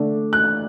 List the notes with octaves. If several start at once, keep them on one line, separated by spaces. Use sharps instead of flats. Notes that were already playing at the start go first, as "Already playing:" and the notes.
Already playing: D3 A3 D4
F#6